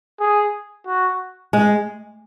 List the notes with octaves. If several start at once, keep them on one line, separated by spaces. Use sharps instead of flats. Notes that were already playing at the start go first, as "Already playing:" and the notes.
G#4
F#4
G#3